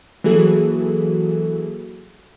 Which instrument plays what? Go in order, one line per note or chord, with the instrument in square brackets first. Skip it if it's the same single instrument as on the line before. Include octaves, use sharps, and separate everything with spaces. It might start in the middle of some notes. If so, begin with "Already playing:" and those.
[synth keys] E3 F#3 A#3 F#4 G#4 A4